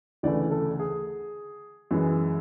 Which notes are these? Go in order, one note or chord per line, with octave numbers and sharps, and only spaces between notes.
D2 C#3 E3 A3 D5
A4
G#4
F#2 E3 G#3